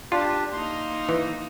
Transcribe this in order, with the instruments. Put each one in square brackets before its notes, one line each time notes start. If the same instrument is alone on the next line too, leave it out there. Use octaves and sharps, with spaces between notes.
[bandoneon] D4 G4 [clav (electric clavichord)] F4
[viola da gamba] A#3 D#4 [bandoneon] C6
[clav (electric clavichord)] E3